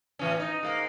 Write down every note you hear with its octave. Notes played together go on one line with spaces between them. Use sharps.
A2 E3 C#4
D#4
G#2 A#3